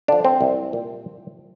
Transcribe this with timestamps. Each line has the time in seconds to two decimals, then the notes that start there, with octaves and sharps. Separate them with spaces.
0.08 D3 F3 D4
0.25 C4
0.41 C2
0.73 A#2